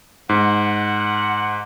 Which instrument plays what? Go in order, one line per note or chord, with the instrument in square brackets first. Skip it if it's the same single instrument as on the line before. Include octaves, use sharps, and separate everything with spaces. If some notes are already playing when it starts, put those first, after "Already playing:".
[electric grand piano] G#2 [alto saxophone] F#5